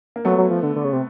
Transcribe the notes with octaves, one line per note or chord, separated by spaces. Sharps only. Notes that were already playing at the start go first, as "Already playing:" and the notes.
A#3
F#3 A3 B3
F#3
F3
D3
D3
C#3
C3